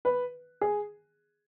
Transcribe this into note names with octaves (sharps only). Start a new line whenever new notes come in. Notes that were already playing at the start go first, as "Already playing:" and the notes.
B4
G#4